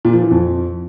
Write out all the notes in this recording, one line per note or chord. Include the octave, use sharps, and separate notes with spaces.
A#2
F3
E3
F2